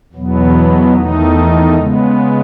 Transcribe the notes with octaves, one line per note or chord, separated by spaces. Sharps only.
E2 B2 F#3 B3
E2 D#3 A3 D#4
C#3 G#3 B3